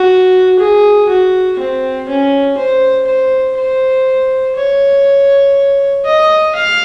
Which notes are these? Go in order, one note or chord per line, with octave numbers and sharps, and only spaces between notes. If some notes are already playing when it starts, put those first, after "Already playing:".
Already playing: F#4
G#4
F#4
C4
C#4
C5
C5
C5
C#5
D#5
F5